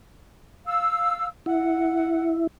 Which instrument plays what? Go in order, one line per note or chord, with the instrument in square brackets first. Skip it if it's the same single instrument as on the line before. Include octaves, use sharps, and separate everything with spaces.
[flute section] F5 E6
[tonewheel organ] E4 [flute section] F#5